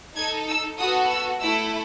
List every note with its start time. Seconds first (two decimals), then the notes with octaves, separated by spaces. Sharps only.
0.16 D#4 A4 G#6
0.48 E6
0.78 B3 F#4 A4 D#6
1.10 E6
1.40 A3 E4 A4 E6